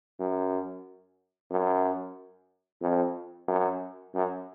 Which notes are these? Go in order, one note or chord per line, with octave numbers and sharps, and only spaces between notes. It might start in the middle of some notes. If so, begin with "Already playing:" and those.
F#2
F#2
F2
F#2
F#2